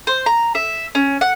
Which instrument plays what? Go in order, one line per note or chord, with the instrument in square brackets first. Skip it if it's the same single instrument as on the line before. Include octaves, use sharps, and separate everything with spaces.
[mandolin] C5
A#5
E5
C#4
F#5